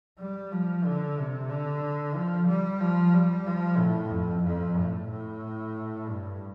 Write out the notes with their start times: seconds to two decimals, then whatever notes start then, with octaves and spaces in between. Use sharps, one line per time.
0.19 G3
0.52 F3
0.85 D3
1.18 C3
1.50 D3
2.15 F3
2.48 G3
2.81 F3
3.14 G3
3.47 F3
3.78 A2
4.11 F2
4.44 F2
4.77 A2
5.09 A2
6.08 G2